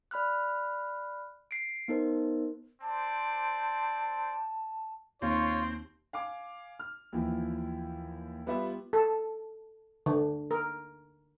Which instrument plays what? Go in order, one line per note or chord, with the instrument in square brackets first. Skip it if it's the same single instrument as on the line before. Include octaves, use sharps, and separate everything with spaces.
[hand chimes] D5 B5 F6 F#6
C7 D7
B3 D#4 A#4 C5
[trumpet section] C4 C5 D5 [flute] A5
[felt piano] D#2 [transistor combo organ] C4 [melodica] F4 [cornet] C#5
[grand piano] F5 G#5 D6
F6
D#2 E3 F3
G3 B3 F4 G4 B4 E5
[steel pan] A4
D3
A#4